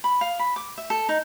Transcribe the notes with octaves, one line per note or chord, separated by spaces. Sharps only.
B5
F5
B5
D6
E5
A4
D#4